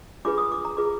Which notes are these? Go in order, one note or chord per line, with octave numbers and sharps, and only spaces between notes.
D4 F4 G#4 B4 D6
D#6
D6
A#5
F4 G#4 B4 D6